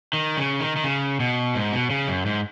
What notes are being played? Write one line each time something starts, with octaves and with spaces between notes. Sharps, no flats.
D#3
C#3
D#3
D#3
C#3
B2
G#2
B2
C#3
F#2
G#2